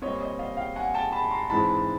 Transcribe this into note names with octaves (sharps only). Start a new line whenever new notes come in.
A#2 G3 C4 C#5 D#5
C#5 D#5
D#5 F5
F5 G5
F#5 G#5
G5 A5
A5 B5
A#5 C6
G#2 E3 G#3 C4 A5 B5